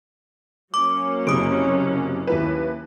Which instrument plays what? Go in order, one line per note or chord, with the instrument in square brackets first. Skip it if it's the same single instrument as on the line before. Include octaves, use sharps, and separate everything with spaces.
[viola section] F#3 A#3 C#4 [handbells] D6
[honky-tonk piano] F#1 C3 [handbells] D#6 D7
[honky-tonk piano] D#2 E4 B4